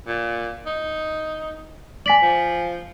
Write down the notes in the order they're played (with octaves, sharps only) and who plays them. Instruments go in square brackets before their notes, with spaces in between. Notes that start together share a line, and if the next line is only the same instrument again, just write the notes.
[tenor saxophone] A#2
D#4
[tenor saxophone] D5 [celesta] G#5 B6 F#7
[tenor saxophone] F3